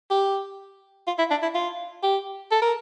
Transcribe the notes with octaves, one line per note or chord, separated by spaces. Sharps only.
G4
F4
E4
D4
E4
F4
G4
A4
A#4